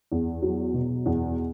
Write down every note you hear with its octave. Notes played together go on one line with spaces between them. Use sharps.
E2
F#3
B2
E2